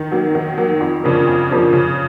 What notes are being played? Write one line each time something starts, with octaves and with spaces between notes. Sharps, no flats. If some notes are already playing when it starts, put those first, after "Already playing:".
Already playing: D#3
F#3 A#3
D#3
F#3 A#3
F2
C#3 F3 A#3 D4
F2
C#3 F3 A#3 D4
C#3